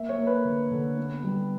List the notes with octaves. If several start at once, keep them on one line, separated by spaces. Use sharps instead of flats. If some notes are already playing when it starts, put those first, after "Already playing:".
Already playing: A#3 E5
C#5
A#3
B4
D3
D3
B3
G3